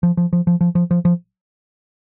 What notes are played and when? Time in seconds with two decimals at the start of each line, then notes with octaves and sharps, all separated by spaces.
0.03 F3
0.17 F3
0.33 F3
0.47 F3
0.61 F3
0.75 F3
0.91 F3
1.05 F3